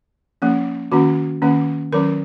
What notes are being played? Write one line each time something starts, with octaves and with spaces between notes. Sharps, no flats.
F3 A#3 C#4
D#3 A#3 C#4 F#4
D#3 A#3 C#4
D#3 F#3 C#4 A#4